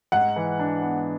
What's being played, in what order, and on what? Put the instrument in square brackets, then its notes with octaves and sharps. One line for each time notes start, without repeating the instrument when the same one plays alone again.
[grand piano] G#2 [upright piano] F#5
[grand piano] E3
D4
B3